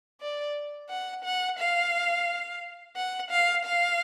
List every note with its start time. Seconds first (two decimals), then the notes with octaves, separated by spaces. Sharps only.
0.21 D5
0.90 F#5
1.25 F#5
1.59 F5
2.96 F#5
3.31 F5
3.65 F5